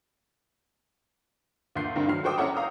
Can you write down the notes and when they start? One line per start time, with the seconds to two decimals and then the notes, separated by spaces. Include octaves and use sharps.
1.76 D2 A#2 C6 G6 C7
1.96 G2 D3 C4 A#4
2.08 D3 D#3 F#3 F6 C7
2.24 F#4 A4 C5 G5 D6 D#6
2.38 C#4 E4 A4 C#5 F#5 A#5
2.54 F5 A#5 D#6 E6 G6